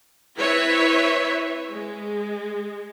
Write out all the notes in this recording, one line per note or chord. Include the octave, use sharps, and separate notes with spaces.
C4 E4 B4 C#5 E5
G#3